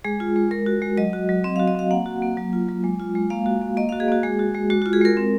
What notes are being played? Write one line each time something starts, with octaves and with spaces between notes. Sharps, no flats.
G#3 G#4
F4
G#3
G#3 A#4
F#4
G#3
F#3 D#5
F#4
F#3
C4 D#5
F5
F#4
D#5
C4 F5
A#3 F#5
F#4
A#3
F#3
F4
F#3
G#3
F4
G#3
A#3 F5
F#4
A#3
A#3 D#5
F5
F#4
G#4
A#3 F#4
G#3 G#4
F#4
G#3
G#3 F#4
F#4
F4
G#4
G#3 A#4
C4